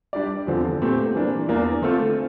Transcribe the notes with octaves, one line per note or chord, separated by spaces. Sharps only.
G3 D4 G4 D5
E2 D3 F3 C4
A#2 A3 C4 G4 C5
E3 A#3 D4
E2 E3 A#3 D4
D3 A3 C4 F4 A4